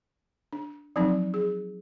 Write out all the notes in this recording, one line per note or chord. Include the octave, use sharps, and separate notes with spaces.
D4
F3 F#3 C4 D#4 D5
G#4